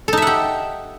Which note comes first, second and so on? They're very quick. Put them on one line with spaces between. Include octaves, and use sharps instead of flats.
A4 D#4 E5 F#5 G4